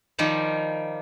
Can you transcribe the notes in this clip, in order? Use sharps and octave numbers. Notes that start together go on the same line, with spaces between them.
D#3 F3 G3 D#4